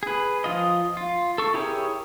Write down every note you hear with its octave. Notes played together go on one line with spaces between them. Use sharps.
G#4 B4
F3 F4 D#5
F4
A4 C#6
E4 G4 G#4 A#4 C#5